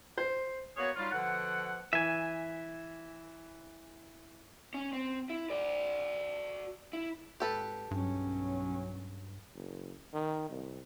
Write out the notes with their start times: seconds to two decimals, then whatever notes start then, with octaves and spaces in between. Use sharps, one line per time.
0.18 C5
0.76 A#3 B3 F#4 G#4 B4 C#5
0.96 F#3 G3 D#4 F4
1.12 B2 D3 F3 F#5
1.93 E3 E5 G#5
4.74 C#4
4.93 C4
5.30 E4
5.50 F#4 D5
6.93 E4
7.40 G#1 G4 A4 B4
7.91 B1 G2 F#3 C#4
9.55 F#1
10.13 D#3
10.50 C2